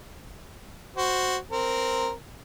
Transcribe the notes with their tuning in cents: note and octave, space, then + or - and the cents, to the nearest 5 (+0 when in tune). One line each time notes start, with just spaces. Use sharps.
F#4 +0 C5 +0
C4 +0 A#4 -5